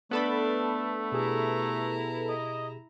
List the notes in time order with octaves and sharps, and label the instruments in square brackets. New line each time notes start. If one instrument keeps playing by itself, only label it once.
[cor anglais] A3 [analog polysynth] B3 A4 B5 [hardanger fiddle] D4
[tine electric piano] B2 G4 G#4 [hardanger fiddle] E4 A#5
[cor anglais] D#5